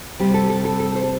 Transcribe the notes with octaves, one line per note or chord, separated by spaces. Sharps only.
C3 G3 C4 G4
A4
A4
A4
A4
C5
A4